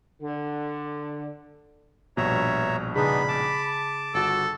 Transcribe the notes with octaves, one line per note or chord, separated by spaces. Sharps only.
D3
A#1 G2 B2 C#5 E5 A#5
C#3 B3 D4 D#4 G#4 B5
A5 D6
G1 F#4 A4